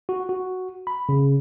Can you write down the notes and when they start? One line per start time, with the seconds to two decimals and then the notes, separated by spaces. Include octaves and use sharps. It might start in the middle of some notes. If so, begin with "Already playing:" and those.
0.09 F#4
0.29 F#4
0.87 B5
1.09 C#3